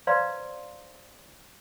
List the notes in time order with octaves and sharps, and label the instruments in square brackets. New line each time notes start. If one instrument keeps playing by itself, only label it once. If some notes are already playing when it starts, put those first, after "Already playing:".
[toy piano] B4 C5 D5 F5 A#5 C6